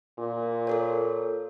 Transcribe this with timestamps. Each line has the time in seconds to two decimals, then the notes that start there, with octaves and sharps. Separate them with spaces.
0.18 A#2
0.67 A4 A#4 C#5